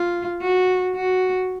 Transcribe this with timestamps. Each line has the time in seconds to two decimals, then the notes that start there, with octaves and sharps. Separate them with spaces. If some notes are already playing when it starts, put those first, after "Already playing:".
Already playing: F4
0.42 F#4
0.96 F#4